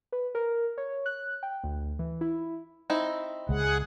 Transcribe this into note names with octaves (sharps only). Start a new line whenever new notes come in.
B4
A#4
C#5
F#6
G5
D2
E3
E4
C4 D#4 E4
C#2 G#4 F#5